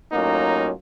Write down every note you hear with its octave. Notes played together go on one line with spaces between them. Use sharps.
A2 F#3 A#3 C#4 D#4 F4